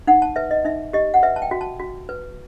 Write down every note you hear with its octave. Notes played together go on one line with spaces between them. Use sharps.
D#4 F#5
A5
B4 E5
D#5
D#4 E5
G4 D#5
F#5
B4 E5
A5
G5
F#4
A5
F#4
B4